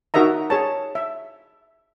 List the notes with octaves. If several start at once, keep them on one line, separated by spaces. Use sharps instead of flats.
D#4 F#4 A#4 D#5 E5 A#5
G#4 C#5 A5
E5